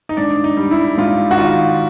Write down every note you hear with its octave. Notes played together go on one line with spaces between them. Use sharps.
D#4
G#2 D4
D#4
G3
E4
G#2 F4
F#4
D#3 F4